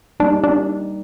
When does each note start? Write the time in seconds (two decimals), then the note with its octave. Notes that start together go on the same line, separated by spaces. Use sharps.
0.20 G3 A#3 D4 D#4
0.44 D4